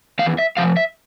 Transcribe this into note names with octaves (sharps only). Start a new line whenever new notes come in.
E2 E3 F5
E5
C3 F3 F5
E5